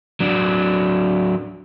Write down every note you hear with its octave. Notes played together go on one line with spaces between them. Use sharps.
F#3 D4